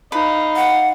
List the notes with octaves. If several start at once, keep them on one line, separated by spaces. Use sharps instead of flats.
D#4 B4 F5
F#5